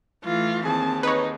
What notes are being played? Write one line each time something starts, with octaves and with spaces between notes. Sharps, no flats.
E3 A3 F4
D#2 C4 G#4 A5
D#4 B4 C#5